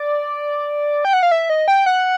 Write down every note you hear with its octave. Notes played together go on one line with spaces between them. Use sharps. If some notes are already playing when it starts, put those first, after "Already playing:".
Already playing: D5
G5
F#5
F5
E5
D#5
G5
F#5